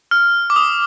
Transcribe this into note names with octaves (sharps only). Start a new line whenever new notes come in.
F6
D6
D#6